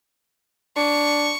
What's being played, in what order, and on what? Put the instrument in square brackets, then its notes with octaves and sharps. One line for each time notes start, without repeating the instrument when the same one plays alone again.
[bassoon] D4 [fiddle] C#6